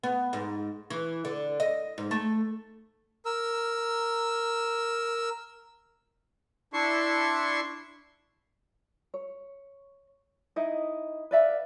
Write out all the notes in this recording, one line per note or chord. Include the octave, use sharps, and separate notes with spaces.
B3
G#2
E3
D3
D#5
G#2
A3
A#4 E6
D4 E4 C6 C#6
C#5
D#4 E4 D#5
B4 D5 E5 F5